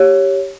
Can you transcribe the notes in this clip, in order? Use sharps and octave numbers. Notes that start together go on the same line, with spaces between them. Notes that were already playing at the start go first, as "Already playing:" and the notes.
Already playing: G4 C#5